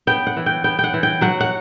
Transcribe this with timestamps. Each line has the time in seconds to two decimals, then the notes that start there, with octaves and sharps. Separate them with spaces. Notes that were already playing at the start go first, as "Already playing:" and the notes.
0.07 B3 G5
0.27 F#5
0.37 E3
0.46 G5
0.64 B3 G5
0.79 G5
0.84 F#5
0.94 E3
1.03 G5
1.21 F#3 F#5
1.41 F#5